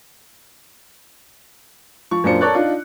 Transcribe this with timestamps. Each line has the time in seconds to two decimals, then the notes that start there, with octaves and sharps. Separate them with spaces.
2.11 F3 C#6
2.24 F#2 A#2 D4 F4 C5 C#7
2.41 A4 A#4 C#5 D5 F#6
2.54 D4 D#4 F4